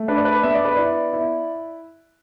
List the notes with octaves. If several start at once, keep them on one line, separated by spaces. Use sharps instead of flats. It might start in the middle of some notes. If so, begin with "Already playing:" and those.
Already playing: A3
D4 B4
D5
B4
B3 E5
D5
B4
E4 D5
E4